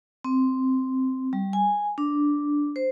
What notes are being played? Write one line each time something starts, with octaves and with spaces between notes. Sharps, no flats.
C4
G3
G#5
D4
C5